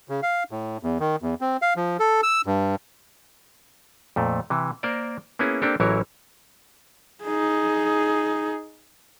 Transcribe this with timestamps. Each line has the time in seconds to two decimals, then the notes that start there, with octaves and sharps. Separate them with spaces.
0.09 C#3
0.23 F5
0.51 A2
0.83 E2
1.00 D#3
1.22 E2
1.41 C4
1.62 F5
1.76 F3
2.00 A4
2.23 E6
2.46 G2
4.16 F2 A#2 A3
4.50 C3 E3
4.83 A#3 A#4 C5 D5
5.39 A#3 B3 C#4 E4 G#4
5.62 A#3 C4 D4 G4 A4
5.80 A1 E3 F#3 E4 A#4 C#5
7.23 D#4 G#4